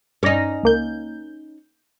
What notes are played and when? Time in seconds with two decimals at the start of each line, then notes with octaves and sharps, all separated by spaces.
0.23 G2 C#4 D#4 D5 A#6
0.63 C#2 A#3 G6